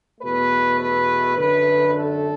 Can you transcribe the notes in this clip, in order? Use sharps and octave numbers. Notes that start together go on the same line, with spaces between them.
E2 B2 A3 B4
B4
F#2 D3 A3 B4
A4